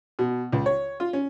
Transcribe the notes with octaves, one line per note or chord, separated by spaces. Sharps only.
B2
C#2
C#5
F4
C#4